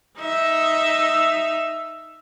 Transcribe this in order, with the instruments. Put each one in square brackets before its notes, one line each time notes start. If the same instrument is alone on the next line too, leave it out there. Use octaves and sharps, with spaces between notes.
[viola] D#4 E5